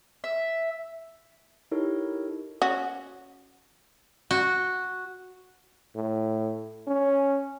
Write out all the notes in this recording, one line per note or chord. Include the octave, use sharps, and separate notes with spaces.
E5
D#4 E4 G4 A4 A#4 C#5
C#4 F#4
F#4
A2
C#4